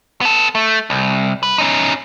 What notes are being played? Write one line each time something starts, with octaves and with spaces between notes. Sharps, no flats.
B3 A4
A3
C2
B4
C#4 D#4